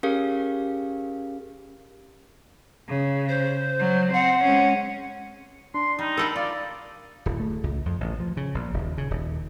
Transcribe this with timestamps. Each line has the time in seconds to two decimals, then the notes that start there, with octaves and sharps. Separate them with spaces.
0.03 C#4 G4 G#4 A#4 F5
2.89 C#3
3.28 C5
3.79 F#3
4.12 C4 F#5
4.43 G#3 C#4
5.74 D4 C6
5.99 G3 D#4
6.17 A4 A#4 F#5 G5 B5 E6
6.36 F4 D5
7.26 D1
7.40 A3
7.63 C#2
7.86 F2
8.01 A1
8.20 F3
8.37 C#3
8.54 A#1
8.74 D#1
8.98 C#3
9.10 D#1